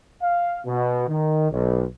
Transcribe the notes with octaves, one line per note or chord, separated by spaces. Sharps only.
F5
B2
D#3
B1